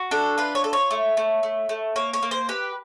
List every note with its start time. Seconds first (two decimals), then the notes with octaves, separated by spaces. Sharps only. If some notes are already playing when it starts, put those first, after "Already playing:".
Already playing: F#4
0.11 D4 A4
0.38 F4 B4
0.55 C#5
0.64 A4
0.73 C#5
0.91 A3
1.17 A3
1.43 A3
1.69 A3
1.96 A#3 C#5
2.13 C#5
2.23 A#3
2.31 C5
2.49 G4 B4